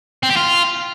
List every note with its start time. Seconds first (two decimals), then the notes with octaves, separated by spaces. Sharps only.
0.23 C4
0.30 G4
0.37 F4